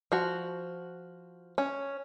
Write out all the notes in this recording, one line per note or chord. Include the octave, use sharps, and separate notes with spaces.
F3 F#4
C#4